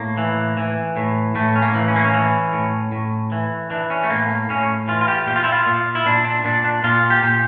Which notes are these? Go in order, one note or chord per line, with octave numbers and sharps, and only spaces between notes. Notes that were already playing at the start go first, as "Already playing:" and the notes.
Already playing: A2 A#3
E3
E3
A2
A2 A3
C#4
A#3
E3
C#4
A#3
C#4
E3
A2
A2
E3
E3 D4
C#4
A3
A2 A#3
A#3
A2 C#4
E3 F4
F4
G4
A#2 G4
F4
E4
F4
A#2
E4
A#2 D4
D4
A#2 D4
D4
A#2 F4
G4
A#2